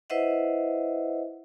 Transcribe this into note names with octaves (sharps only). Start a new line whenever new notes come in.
E4 B4 C5 D#5 E5 F#5